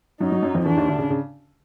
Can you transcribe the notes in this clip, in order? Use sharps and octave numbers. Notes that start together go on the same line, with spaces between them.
F#2 F#3 D#4
F#2 F#3
F#2 F#3
F2 F3
E2 E3 D4
D#2 D#3
D2 D3
C#3
C#3